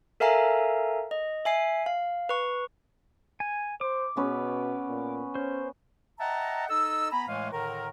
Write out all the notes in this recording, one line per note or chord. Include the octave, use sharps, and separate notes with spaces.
A4 A#4 E5 F5 G#5 A#5
D#5
E5 G#5 C7
F5
B4 C#6
G#5
C5 D6
B2 B3 C#4 B4
A#2
C#4 C5
D#5 E5 F#5 G5 A5 A#5
D#4 A4 D#5 E6
B3 G#5 A#5 B5
A2 E3 G#3 A3 F5 G#5
A2 D3 D#3 A#4